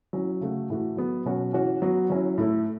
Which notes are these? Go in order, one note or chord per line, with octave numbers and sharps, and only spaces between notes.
F#3 C#4 E4
C#3 A3 F#4
A2 E3 A3 F#4
F#3 B3 F#4
B2 F#3 C#4 F#4
E3 C#4 F#4
F#3 B3 F#4
F#3 C#4 E4
A2 A3 E4